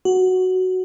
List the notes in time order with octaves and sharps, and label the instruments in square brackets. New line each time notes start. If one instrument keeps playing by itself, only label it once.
[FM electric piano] F#4